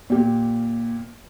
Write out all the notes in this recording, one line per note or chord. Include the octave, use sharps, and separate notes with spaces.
A#2 G4